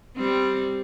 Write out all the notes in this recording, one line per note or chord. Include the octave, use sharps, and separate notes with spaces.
G3 C4